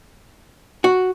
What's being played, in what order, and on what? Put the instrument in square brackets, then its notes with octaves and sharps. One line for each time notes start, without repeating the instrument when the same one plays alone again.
[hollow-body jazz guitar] F#4